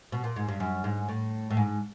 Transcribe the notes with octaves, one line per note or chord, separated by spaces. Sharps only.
B2
A#2
G#2
G2
F#2
G#2
A2
A2
G#2